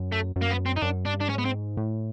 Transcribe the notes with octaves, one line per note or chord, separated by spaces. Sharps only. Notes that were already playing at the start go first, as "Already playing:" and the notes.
Already playing: F#2
A3
F#2
A#3
B3
C4
D#4
F#2 D4
G2 D4
D4
G#2 C#4
B3
C4
A2